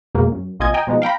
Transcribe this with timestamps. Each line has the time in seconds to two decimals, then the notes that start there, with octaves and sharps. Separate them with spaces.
0.15 F2 B2 G#3 A#3
0.32 F#2
0.60 A#1 C3 F4 D#5 G#5 G#6
0.74 D#5 G5 G#5 A#5
0.87 B2 F3 G#3 B3 D#4
1.02 F5 G5 A#5 B5